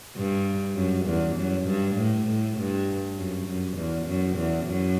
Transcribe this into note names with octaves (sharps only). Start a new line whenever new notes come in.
G2
F#2
E2
F#2
G2
A2
A2
G2
F#2
F#2
E2
F#2
E2
F#2